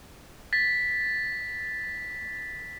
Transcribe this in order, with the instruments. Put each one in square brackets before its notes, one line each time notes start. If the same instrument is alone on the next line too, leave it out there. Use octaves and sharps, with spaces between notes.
[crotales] A6 B6